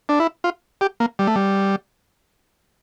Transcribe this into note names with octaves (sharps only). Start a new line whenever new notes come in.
D4
E4
F4
G4
A#3
G3
A3
G3